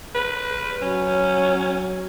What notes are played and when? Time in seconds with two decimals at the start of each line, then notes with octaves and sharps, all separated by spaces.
0.15 B4
0.82 F#3 C#4